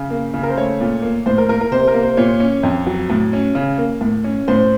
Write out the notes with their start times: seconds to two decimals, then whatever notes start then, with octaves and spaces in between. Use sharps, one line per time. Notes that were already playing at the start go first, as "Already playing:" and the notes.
Already playing: C#3
0.10 A#3
0.34 C#3
0.43 A#4
0.49 C5
0.57 A3 C#5
0.80 A#2
1.02 A#3
1.26 A2 C5
1.38 A#4
1.49 A#3 A#4
1.61 A#4
1.71 C3 C5
1.88 A#4
1.94 A#3
2.03 C5
2.17 A#2 C#5
2.40 C#4
2.63 F2
2.86 F#3
3.10 A2
3.33 C#4
3.55 C#3
3.78 A#3
4.01 A2
4.24 C#4
4.48 A2 C5